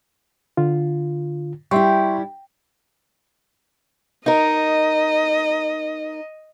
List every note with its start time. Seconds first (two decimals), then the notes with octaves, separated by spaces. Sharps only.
0.57 D3 F4
1.71 G3 E4 E5 G5 C6 C#6
4.26 D#4 A#4 D#5